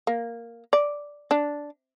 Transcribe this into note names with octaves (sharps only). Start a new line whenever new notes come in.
A#3
D5
D4